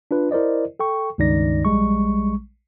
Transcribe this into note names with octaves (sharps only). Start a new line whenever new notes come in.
D4 F4 B4
E4 A#4 C5 D5 D#5
A4 G5 C#6
C#2 G2 D#3 D#4 D5 A#6
A#1 G3 G#3 C#6